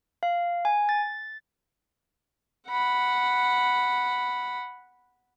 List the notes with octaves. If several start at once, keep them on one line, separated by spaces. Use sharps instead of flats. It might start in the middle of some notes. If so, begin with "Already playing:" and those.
F5
G#5
A6
F#5 B5